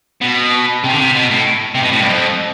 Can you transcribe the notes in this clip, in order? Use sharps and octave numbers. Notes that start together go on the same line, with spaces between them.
B2
C3
D3
C3
B2
A2
C3
B2
A2
G2
F2